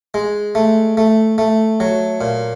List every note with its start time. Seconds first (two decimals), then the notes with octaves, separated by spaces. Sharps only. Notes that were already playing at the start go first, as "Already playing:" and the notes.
0.14 G#3
0.55 A3
0.97 A3
1.38 A3
1.80 F#3
2.21 A#2